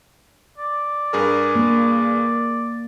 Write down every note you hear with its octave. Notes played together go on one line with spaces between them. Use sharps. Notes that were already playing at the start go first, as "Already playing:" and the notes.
D5
G2 G#4 A#4
A#3